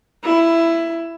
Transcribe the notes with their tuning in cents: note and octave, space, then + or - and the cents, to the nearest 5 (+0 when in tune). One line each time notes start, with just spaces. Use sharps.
E4 +15